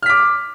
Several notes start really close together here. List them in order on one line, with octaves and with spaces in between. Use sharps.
F6 B6 D6